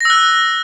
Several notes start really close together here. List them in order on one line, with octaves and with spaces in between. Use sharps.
A#6 E6 F#6